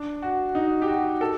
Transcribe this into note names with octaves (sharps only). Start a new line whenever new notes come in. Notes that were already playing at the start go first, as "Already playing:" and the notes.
Already playing: D4
F#4
D#4
G4
F#4
A4